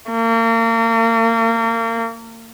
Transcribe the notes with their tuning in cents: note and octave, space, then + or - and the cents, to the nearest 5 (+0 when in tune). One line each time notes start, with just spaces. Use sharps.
A#3 -35